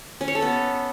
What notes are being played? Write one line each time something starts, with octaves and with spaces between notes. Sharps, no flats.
C#4
C#5
A4
B3